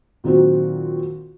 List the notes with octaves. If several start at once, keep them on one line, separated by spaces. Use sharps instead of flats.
A#2 D#3 F#3 C4 F#4